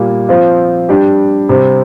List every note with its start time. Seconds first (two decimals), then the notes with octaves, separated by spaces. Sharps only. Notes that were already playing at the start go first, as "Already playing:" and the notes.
Already playing: A#2 G3 A#3
0.29 F3 C4 F4
0.89 G3 D4 G4
1.49 C3 G3 C4